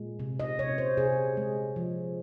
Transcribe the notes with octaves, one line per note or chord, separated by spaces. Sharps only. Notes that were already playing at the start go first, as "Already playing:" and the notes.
Already playing: A#2 G#3
C3
D#5
C3 C#5
C5
C3 G#4
G#3
F3